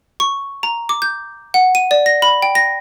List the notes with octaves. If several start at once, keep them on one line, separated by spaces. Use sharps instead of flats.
C#6
A#5
D6
G6
F#5
D#7
D5
A#6
B5
G5
A#6